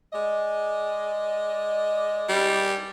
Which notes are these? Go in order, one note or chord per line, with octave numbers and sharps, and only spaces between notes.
G#3 D5 D#5
G3